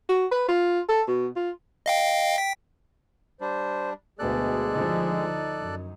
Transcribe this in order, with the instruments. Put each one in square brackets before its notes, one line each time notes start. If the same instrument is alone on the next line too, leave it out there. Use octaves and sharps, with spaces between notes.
[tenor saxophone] F#4
B4
F4
A4
B2
F4
[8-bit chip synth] D#5 F5 G5
G5 B6
[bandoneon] G3 D4 [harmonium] C5
[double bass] D2 B2 [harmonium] G#3 G#4 [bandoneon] A4 D5 F#6
[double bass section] D3 F3 [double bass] D#4
[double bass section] F#2